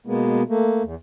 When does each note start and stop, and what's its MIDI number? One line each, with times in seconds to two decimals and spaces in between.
0.07 0.42 47
0.07 0.42 56
0.07 0.42 58
0.07 0.42 59
0.49 0.83 57
0.49 0.83 58
0.83 0.95 40